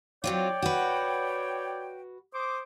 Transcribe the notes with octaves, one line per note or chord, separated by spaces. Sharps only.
F#3 C4 F4 C#5 D5 G5
F#4 B4
C5 D6 D#6